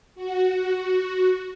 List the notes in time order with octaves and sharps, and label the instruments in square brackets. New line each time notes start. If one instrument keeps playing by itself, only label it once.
[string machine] F#4